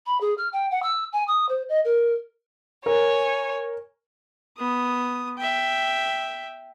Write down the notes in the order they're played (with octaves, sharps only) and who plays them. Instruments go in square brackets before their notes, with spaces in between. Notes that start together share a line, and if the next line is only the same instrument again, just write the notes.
[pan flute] B5
G#4
F6
G5
F#5
E6
G#5
D#6
C5
D#5
A#4
[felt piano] A#4 [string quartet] C#5 G#5
[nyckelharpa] B3 D#6
E5 G5